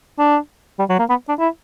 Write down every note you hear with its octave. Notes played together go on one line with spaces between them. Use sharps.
D4
G3
F#3
A#3
B3
D4
E4